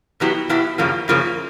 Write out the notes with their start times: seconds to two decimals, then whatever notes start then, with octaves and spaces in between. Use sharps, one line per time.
0.20 B2 F#3 B3 E4 G4
0.49 B2 F#3 B3 E4 G4
0.78 F#2 C#3 F3 A#3
1.08 F#2 C#3 F3 A#3